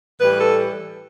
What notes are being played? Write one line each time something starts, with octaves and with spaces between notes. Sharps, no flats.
A2 E3 G3 B4
A4